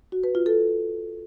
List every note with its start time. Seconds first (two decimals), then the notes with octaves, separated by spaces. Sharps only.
0.12 F#4
0.24 B4
0.35 F4
0.46 A4